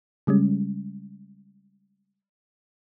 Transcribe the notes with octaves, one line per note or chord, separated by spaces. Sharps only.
C#3 G3 G#3 C#4